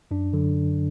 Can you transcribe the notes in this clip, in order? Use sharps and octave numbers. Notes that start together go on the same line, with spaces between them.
F#2 D4
D3 F#3